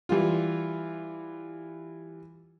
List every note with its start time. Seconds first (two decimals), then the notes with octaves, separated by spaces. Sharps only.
0.09 E3 G3 F4